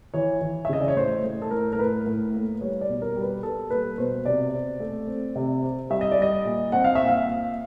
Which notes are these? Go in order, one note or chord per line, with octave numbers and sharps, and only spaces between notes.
E3 C#5
E3
E5
C#3 D#5
D5
C#5
A2 C5
A2
A4
A2 A#4
A#4
A2 B4
A2
A#3
G3 C#5
D5
B2
A#4
G3
B4
G3 A4
A#3 B4
B2 C5
C3 D5
C4
A3
C4
C3
C4
G3 E5
D#5
D5
G3 D#5
A#2
C4 F#5
F5
A#2 E5
F5
A#2